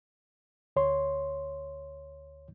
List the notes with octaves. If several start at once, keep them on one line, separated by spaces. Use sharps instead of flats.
D2 C#5 C6